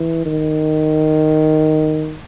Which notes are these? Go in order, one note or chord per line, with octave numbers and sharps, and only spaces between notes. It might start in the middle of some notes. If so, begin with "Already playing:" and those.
Already playing: E3
D#3